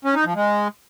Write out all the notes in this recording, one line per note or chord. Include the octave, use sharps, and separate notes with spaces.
C#4
D#4
F3
G#3